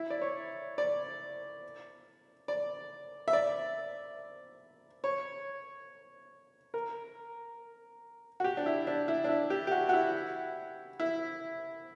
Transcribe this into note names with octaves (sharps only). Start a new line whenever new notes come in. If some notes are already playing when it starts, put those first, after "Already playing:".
Already playing: E4
D5
C#5
D5
D5
E5
D5
C#5
A#4
F#4
G4
D4
E4
D4
E4
D4
E4
G4
G4
F#4
F#4
E4
E4